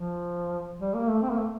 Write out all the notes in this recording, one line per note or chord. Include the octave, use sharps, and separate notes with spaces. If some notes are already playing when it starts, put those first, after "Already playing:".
Already playing: F3
G3
A#3
A3
C4
A#3
A3